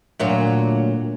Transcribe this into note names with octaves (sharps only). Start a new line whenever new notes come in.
D2 A#2 F#3